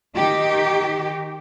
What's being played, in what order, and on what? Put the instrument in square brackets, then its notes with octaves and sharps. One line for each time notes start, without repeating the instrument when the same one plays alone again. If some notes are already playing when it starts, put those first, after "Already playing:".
[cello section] D#3 D#4 G4